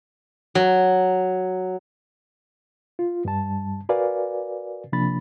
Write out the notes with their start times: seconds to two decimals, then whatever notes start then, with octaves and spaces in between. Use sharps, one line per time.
0.55 F#3
2.99 F4
3.25 G2 G3 A5
3.89 F#4 A#4 B4 D5 F5 G#5
4.92 C3 F3 A#3 D4 B5 A6